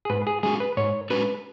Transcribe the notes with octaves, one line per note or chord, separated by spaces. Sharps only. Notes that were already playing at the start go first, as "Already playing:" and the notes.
G#4
G#2 B4
G#4
G#3 C#4 F#4 G#4
B4
G#2 C#5
G#3 C#4 F#4 B4